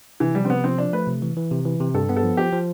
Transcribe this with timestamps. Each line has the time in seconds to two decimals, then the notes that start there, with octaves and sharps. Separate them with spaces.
0.20 C3 E3
0.35 F3 G3
0.45 C4
0.50 C3 B3
0.64 F3 C4
0.78 F3 D4
0.93 A3 B4
1.07 C3
1.22 E3
1.37 E3
1.51 C3
1.65 E3
1.80 C3
1.94 G2 A4
2.09 B3
2.17 A4
2.23 F3
2.37 F3 G4
2.52 F3